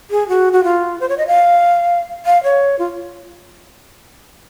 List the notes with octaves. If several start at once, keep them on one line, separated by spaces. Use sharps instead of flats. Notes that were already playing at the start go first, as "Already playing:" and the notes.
G#4
F#4
F#4
F4
C5
C#5
D#5
F5
F5
C#5
F4